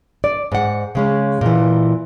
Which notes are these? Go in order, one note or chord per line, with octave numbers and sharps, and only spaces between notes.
D5
G#2 F#5
C#3 G#3 C#4
A#2 E3